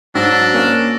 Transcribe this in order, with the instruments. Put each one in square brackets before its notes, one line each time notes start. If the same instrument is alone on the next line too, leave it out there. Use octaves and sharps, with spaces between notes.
[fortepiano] G#2 [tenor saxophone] F#3 [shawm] D4 [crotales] E6 A6 A#6
[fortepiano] A#3 [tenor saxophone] C#4